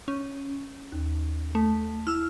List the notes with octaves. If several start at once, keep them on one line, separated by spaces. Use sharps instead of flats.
C#4
D#2
A3
E4 E6 F6